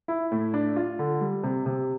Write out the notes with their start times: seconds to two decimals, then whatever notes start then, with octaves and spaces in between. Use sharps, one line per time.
0.08 E4
0.32 A2
0.54 D4
0.76 F4
0.99 D3
1.21 G3
1.43 C3
1.66 C3